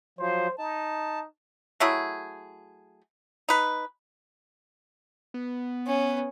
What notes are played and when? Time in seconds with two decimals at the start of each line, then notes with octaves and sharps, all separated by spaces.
0.19 F3 F#3 C5
0.59 D#4 A5
1.80 F#3 A3 E4 G#4
3.49 D#4 B4
5.34 B3
5.87 C#4